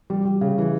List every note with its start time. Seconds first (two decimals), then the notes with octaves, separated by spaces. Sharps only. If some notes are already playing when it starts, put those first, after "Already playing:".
0.10 G3
0.25 G3
0.41 C#3
0.58 E3